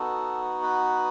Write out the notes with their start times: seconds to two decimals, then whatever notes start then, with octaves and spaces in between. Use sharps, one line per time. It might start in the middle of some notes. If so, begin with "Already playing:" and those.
Already playing: B3 D#4 F#4 A4
0.63 B4